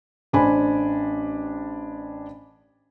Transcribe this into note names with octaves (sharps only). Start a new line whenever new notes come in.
A1 D4 C5 G#5 B5